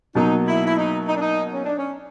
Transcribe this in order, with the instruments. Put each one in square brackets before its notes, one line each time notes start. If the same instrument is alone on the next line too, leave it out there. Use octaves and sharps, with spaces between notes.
[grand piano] B2 F#3 A#3 [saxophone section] D#4
[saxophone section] E4
E4
D#4
D#4
D4
D#4
C#4
D4
C#4